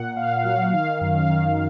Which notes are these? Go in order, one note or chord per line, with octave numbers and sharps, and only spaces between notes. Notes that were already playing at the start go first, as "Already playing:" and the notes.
Already playing: A#2 F#5
A#2 F5
F#3 F5
D#3 F5
F#2
F5
D#3